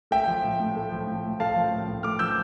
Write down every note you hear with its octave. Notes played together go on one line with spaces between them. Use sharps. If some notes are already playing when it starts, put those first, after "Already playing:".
A3 E5 G5
F3
A2
A2
A3
F3
A2
A2
A3 F5 A5
F3
A2
A2
A3 D6 F6
F3 E6 G6